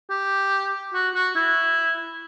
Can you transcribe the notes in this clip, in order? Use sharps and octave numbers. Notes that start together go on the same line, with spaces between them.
G4
F#4
F#4
E4